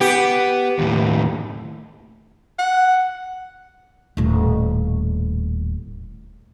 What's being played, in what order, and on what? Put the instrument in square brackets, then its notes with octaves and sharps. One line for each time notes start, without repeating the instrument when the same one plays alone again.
[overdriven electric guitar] B3 [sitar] G4
[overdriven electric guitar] D#2 A2
[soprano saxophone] F#5
[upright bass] D#1 A2